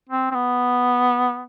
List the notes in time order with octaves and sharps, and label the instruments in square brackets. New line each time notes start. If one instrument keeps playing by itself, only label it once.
[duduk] C4
C4
B3